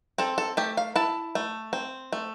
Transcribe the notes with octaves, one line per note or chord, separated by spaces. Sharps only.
C4 A4
A4
A3 G4
F5
E4 A5
A3
C4
A3